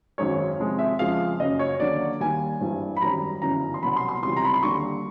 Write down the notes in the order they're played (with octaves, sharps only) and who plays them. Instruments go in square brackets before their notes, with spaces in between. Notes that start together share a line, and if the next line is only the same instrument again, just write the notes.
[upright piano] G#1 F#2 D#3 G#3 C#5
F2 C3 F3 G#3
E5
F2 C#3 F3 G#3 F5
F#1 F#2 C#3 D#5
C#5
D#2 D3 F#3 D5
D#2 D#3 G3 G#5
G#1 G2 E3 G3
B5
G#1 F#2 D#3 G3 A#5
G1 F#2 C#3 E3 A#5
C6
C2 B2 F#3 B5
C6
C6
C#2 C3 E3 G3 C6
A#5
B5
C6
D#2 D3 G3 C#6